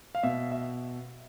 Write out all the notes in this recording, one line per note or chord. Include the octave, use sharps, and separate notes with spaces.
F5
B2 E5
E5